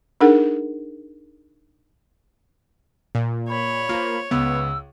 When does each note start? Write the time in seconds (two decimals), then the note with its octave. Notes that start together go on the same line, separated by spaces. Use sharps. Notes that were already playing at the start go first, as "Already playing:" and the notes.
0.21 D4 D#4 G#4 A#4 F#5
3.15 A#2
3.49 C#5 B5
3.89 A#3 F4 C5
4.31 C#2 B3 E6